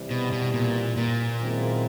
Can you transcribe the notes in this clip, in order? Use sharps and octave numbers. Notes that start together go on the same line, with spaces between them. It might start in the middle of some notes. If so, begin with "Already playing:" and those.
Already playing: C3 E3 G3
B2
B2
A#2
A#2
F#2 D#3 G#3 C4 E4